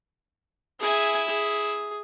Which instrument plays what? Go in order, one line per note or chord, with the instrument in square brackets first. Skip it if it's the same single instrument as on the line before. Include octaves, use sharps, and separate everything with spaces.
[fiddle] E4 E5 [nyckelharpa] G#4 G#5
[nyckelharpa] G#4